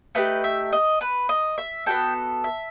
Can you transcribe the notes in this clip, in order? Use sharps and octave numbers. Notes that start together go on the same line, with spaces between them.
A3 D#4 G4 B4
E5
D#5
B4
D#5
E5
B3 F#4 A4 G5
E5